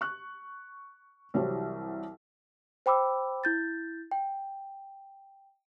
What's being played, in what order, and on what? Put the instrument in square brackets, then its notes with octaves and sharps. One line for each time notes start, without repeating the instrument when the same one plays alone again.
[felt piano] C#6 F#6
C2 E3 F#3 G3 C5 C#5
[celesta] C5 G5 B5 D6 E6
E4 G6 A6
G5